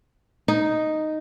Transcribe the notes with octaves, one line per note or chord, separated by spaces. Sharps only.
D#4